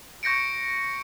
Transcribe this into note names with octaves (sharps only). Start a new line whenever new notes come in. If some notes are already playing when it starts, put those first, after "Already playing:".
C#6 G6 A#6 C#7 D7